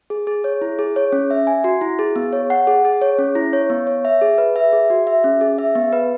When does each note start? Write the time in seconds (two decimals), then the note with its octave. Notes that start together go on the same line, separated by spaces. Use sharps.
0.10 G#4
0.27 G#4
0.44 C#5
0.61 E4
0.79 G#4
0.96 C#5
1.12 C#4
1.31 E5
1.47 G#5
1.64 F#4
1.81 E4
1.99 G#4
2.16 B3
2.33 C#5
2.50 F#5
2.67 G#4
2.85 G#4
3.02 C#5
3.19 C#4
3.35 E4
3.53 C#5
3.70 B3
3.87 C#5
4.05 E5
4.21 G#4
4.38 B4
4.56 E5
4.73 G#4
4.90 F#4
5.07 E5
5.24 C#4
5.41 G#4
5.58 E5
5.75 B3
5.92 B4